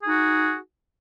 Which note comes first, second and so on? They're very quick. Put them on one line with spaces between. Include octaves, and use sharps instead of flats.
G#4 D#4 F#4